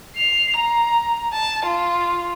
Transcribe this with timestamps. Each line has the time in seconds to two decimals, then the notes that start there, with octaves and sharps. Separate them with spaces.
0.16 C7 F7
0.56 A#5
1.33 A5
1.65 F4